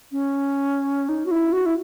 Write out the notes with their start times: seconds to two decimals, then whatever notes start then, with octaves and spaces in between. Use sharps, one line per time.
0.12 C#4
1.09 D#4
1.26 F#4
1.31 E4
1.52 F#4
1.66 E4